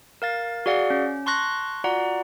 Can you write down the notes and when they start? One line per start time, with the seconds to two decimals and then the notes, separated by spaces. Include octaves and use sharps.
0.22 A#4 F5 A6
0.66 F#4 G#4 D5 F5 F#5
0.90 C#4
1.26 A5 C6 C#6 F#6 A#6
1.84 F4 F#4 D5 F#5 A#5